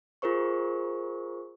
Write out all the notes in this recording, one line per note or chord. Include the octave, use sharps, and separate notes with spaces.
F4 G#4 A#4 C5 C#6